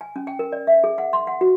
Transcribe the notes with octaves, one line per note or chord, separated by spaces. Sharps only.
G#5
C#4
G5
A#4
D5
E5
G#4
F#5
C6
F#5
F#4